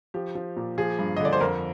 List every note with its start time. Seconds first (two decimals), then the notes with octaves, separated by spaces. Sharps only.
0.14 F3 G4
0.35 F3
0.57 A#2
0.78 F3 G#4
0.99 G2
1.17 D#5
1.20 D3
1.25 D5
1.33 C5
1.41 F2 A#4